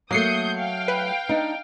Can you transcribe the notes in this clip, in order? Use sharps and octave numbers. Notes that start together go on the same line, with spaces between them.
F#3 A3 A#3 D#6 G6 C7 C#7
F5 G5
B4
D4 D#4